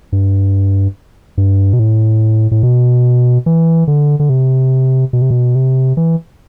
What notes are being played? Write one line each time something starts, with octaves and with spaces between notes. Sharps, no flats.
G2
G2
B2
A2
A2
B2
E3
D3
D3
C3
B2
C3
B2
C3
E3